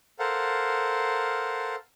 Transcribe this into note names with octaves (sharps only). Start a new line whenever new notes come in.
A4 A#4 C5 F5 F#5